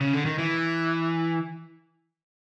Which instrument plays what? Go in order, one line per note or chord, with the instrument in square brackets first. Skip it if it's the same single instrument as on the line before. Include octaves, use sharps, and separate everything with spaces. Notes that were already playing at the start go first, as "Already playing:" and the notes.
[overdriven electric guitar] C#3
D3
D#3
E3